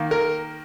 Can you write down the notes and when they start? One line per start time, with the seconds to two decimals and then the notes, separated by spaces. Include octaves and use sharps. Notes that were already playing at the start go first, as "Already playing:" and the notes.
Already playing: D#3 A#3
0.11 A#4